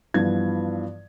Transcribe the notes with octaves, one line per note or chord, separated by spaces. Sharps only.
G2 E3 F3 B3 G#6